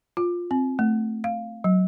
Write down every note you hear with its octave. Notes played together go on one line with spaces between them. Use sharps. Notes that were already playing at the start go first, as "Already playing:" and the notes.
F4
C4
A3
F5
F#3